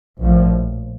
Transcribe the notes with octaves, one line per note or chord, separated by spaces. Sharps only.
A#1 A2 F3